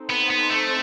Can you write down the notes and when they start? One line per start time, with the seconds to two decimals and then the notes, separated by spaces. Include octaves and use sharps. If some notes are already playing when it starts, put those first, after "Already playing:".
Already playing: C4 D#4 A4 C5
0.10 B3
0.30 B3
0.50 A3